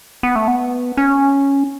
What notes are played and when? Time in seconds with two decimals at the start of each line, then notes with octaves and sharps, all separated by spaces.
0.23 B3
0.36 A3
0.48 B3
0.97 C#4